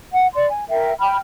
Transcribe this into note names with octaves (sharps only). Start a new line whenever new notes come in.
F#5
D5 C6
G#5
A#4 E5 G5
G5 B5 F6